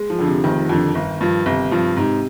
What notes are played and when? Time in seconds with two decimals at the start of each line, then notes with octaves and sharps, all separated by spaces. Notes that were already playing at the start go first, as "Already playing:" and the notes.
Already playing: G#3
0.10 F3
0.19 F2 D3
0.27 C3
0.44 F1 D#3
0.69 F2 D3
0.95 G1
1.20 G2 F3
1.46 G1 C3
1.71 G2 F3
1.97 G#2 C3